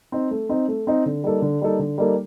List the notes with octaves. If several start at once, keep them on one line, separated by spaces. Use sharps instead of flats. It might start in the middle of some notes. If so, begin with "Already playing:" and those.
C4 D#4
A3
C4 D#4
A3
C4 D#4
D3
G3 A#3 D#4 A4
D3
G3 A#3 D#4 A4
D3
G3 A#3 D#4 A4